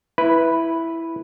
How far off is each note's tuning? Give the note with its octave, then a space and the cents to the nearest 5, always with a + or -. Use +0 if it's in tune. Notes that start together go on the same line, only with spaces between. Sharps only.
E4 +0 B4 +0